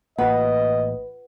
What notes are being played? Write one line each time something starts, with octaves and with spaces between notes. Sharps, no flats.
A1 A#3 F4 B4 D#5 F#5